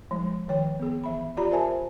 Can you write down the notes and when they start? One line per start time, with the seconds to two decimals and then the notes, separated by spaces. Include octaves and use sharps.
0.11 F3 G#3
0.48 D#3 F3 C#5 G5
0.80 B3 G#4
1.04 E3 E5 B5
1.37 F4 G4 D5 A#5 B5
1.51 A#4 C5 E5 G#5 A5